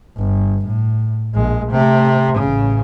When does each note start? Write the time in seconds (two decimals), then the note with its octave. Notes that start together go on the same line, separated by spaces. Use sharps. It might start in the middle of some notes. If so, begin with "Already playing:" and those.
0.18 G1
0.66 A2
1.34 A#1 G#3
1.71 C3 A3
2.38 A1 C#3